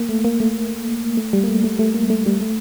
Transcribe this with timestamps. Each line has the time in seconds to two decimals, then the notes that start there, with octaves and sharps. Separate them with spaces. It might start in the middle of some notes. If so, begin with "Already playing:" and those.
Already playing: A#3
0.09 A3
0.25 A#3
0.40 A3
1.17 A3
1.33 G3
1.44 A#3
1.48 A3
1.64 A3
1.79 A3
1.94 A#3
2.10 A3
2.26 G3
2.41 A3